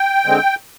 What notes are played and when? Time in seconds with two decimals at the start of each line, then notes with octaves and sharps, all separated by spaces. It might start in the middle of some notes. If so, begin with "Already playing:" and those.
Already playing: G5
0.26 D3 G#3 C4